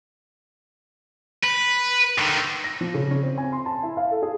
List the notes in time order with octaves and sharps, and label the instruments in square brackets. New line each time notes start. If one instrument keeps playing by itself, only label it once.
[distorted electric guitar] B4
D3 D#3
[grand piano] A#6
F3
C#3
C#4
C4
G#5
C6
A5
E4
F5
A4
G#4